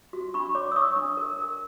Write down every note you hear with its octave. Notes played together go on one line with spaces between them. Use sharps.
F#4
D4 B5 C#6
C#5 C6 D6
E6
C#5 C#6 D#6
D4
A#4
A#4